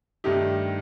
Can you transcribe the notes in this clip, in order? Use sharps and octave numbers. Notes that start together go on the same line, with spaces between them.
G2 D#3 A3 D#4 G4